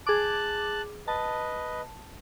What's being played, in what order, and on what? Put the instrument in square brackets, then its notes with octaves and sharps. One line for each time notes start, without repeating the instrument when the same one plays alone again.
[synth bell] G#4 D6 [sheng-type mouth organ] A5 F#6
[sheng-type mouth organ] B4 D#5 [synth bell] A5